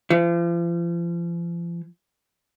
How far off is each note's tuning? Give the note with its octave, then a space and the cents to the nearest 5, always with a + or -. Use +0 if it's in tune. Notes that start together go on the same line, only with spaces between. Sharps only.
F3 -40